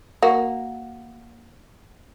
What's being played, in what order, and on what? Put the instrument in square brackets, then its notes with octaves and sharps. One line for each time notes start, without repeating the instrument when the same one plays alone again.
[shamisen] A#3 F#4